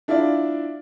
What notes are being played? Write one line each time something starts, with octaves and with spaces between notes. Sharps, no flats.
D4 E4 F4 D5